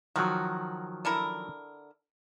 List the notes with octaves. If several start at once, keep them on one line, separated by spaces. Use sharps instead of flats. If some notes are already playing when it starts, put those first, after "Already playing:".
D#3 F3 F#3 F#4
D3 E4 A#4